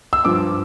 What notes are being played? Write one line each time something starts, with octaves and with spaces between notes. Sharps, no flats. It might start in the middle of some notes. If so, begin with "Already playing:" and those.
E6
G2 F3 D6